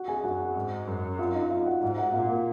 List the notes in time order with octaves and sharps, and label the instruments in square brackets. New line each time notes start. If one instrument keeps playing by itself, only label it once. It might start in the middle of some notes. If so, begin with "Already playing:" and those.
Already playing: [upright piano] F#4 F#5
G#4 G#5
[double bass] F#2 [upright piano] F#4 F#5
[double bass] G#2
F#2
[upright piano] F4 F5
D#4 D#5
F4 F5
F#4 F#5
[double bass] G#2 [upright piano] F#4 F#5
[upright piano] F#4 F#5
[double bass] A#2 [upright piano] F4 F5
[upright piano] A#4